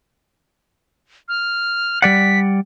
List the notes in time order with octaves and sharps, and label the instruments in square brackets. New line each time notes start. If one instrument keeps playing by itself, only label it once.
[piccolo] F6
[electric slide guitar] G3 D5 F#5 [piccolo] B6